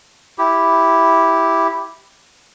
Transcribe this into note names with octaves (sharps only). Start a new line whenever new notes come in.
E4 G4